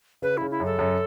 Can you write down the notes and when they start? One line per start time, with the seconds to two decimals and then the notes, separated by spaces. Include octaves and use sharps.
0.22 C#3 B4
0.37 C#3 E4
0.50 E4
0.60 F#2
0.65 A4
0.79 F#2